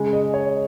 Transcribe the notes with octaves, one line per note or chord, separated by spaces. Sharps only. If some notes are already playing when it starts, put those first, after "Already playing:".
Already playing: C#3 G#3
D#5
C#5